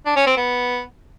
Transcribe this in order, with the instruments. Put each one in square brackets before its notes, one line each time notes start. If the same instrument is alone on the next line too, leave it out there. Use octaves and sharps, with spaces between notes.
[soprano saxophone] D4
C#4
C4
B3